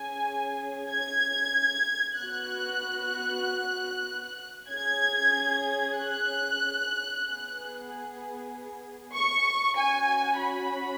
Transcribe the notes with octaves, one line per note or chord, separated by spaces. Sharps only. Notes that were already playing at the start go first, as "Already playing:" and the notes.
Already playing: C#4 G#4 G#5
G#6
B3 F#6
F#4
C#4 G#4 G#6
F#6
B3 G#4
C#6
C#4 F#4 G#5
B5